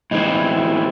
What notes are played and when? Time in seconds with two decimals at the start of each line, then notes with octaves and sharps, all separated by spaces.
0.11 A2 E3 G#3 C4 D#4
0.35 E4
0.57 E4